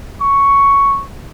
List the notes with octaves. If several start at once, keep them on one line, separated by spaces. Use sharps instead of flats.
C#6